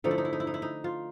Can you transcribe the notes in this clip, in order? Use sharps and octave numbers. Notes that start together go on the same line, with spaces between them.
D3 F3 A3 D#4
E4
D#4
E4
D#4
E4
D#4
E4
D#4
F4